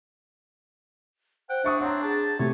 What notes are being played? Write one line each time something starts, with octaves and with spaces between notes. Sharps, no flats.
C5 F#5 G5
D4 E5 C#6 D#6
C4 C#5 F#5 A#5
G#4 A5
C3 A3 C#5 E5